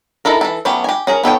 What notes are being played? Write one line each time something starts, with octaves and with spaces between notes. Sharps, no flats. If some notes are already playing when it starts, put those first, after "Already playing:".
D#4 E4 A4 A#4
E3 A4
F#3 A3 B3 C#4 G4
G4 G#5
C#4 G#4 A#4
B3 A4 C#5 G5